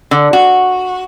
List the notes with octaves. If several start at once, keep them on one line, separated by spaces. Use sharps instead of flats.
D3
F#4